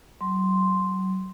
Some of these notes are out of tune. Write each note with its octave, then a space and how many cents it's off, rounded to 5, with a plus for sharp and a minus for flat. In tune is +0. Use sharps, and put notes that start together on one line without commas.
F#3 +30 C6 +0